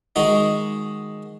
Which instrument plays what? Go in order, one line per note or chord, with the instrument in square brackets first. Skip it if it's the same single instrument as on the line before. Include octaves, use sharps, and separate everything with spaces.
[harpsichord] D#3 G#3 D#4 F#4